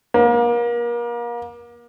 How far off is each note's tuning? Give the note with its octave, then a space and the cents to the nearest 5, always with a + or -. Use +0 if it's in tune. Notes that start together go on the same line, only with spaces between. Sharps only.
A#3 +35